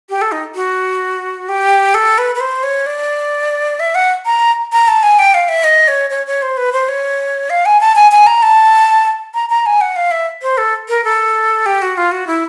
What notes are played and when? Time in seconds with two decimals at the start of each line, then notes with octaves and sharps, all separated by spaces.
0.09 G4
0.22 A4
0.32 D#4
0.55 F#4
1.49 G4
1.94 A4
2.18 B4
2.35 B4
2.40 C5
2.63 C#5
2.86 D5
3.80 E5
3.95 F#5
4.26 A#5
4.73 A#5
4.88 A5
5.03 G#5
5.19 G5
5.34 F5
5.48 E5
5.64 D#5
5.88 C#5
6.10 C#5
6.27 C#5
6.42 C5
6.57 B4
6.73 C5
6.88 C#5
7.50 F5
7.66 G#5
7.81 A5
7.96 G#5
8.12 G#5
8.27 A#5
8.43 A5
9.34 A#5
9.49 A#5
9.66 G#5
9.81 F#5
9.96 F5
10.11 E5
10.42 C5
10.58 A4
10.89 A#4
11.04 A4
11.66 G4
11.82 F#4
11.97 F4
12.12 F#4
12.27 E4